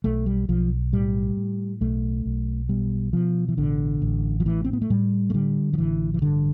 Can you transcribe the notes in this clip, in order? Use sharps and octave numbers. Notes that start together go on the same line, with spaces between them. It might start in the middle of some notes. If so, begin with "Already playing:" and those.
B1 A3
G3
B1 F3
A2 G3
A2
B1 A3
B1
B2 G3
B2 F3
E3
A1 D3
A1
F3
A2 E3
C4
B3
A3
A2 G3
A3
D3 G3
F3
A1 E3
E3
G2 D3